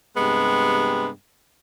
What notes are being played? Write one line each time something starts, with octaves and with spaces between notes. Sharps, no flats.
G2 C3 G#3 B3